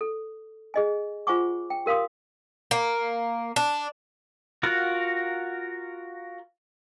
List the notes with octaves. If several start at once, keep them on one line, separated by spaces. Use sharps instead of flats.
A4
G#4 D#5 G#5
F4 C5 F#5 G#5 C#6 D6
G5
G4 A#4 F5 C6 D#6
A#3
D4
F4 F#4 A#4 F#5